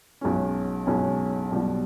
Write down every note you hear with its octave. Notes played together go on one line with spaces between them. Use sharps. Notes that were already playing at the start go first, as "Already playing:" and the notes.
B1 B2 G#3 C#4
B1 B2 G#3 C#4
B1 B2 G3